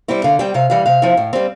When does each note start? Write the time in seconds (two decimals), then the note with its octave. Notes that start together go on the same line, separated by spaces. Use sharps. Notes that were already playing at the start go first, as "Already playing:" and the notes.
0.08 G3 C4 E4
0.24 D3 F5
0.39 G3 C4 G5
0.54 C3 F5
0.70 E3 G3 F5
0.86 C3 F5
1.02 F3 C4 E4
1.17 A2
1.33 G3 C4